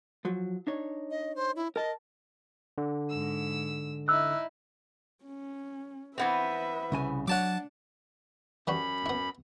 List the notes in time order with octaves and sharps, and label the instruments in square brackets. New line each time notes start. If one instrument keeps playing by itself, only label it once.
[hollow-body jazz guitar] F3 F#3
D4 D#4 C#5
[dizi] D#5
C5
E4
[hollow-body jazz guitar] A#4 A5 [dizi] D#5
[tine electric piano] D3
[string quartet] G#2 E6
[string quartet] D#4 E4 [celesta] E6 F#6
[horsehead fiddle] C#4
[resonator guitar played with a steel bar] E3 B3 C4 [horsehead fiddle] B4 E5
[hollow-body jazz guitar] C2 C#3 G#5
[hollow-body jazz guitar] F#3 C#5 [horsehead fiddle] D4 [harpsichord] F#5 A5 D6
[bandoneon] F#2 B5 [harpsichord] E3 G3 F#4
[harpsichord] B3 E4